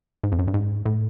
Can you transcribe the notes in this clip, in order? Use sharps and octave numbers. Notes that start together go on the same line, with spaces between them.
G#2
F2
F#2
G2
G#2
A2